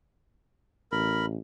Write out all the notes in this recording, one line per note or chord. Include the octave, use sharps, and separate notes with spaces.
A1 A#4 B5